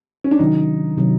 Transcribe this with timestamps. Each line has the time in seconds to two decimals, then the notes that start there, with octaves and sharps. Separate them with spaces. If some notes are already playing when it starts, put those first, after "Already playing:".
0.24 C#4
0.31 D4
0.39 C3 D#3 F#3 D#4
0.98 C3 D#3 F#3